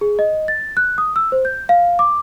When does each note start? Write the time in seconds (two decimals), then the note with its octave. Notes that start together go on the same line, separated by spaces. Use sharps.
0.01 G#4
0.19 D#5
0.48 A6
0.77 F#6
0.98 D#6
1.16 E6
1.32 C5
1.45 G6
1.69 F5
1.99 D6